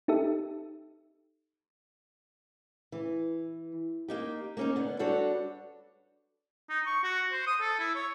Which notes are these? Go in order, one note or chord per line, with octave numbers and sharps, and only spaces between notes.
D#4 G4 A4 E5
E3
A#3 D#4 G4
A#3 C#4 D#4
D3 B3
G3 D4 F#4 A4 C#5
D#4
C#6
F#4
C5
D#6
A4
E4
C#5